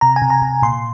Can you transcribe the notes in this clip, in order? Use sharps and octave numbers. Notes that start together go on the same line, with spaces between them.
C3 A#5
G#5
C3
A#5
C3
A#2 C6